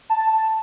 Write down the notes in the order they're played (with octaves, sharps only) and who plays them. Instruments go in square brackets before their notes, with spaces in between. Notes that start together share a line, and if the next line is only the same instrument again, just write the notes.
[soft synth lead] A5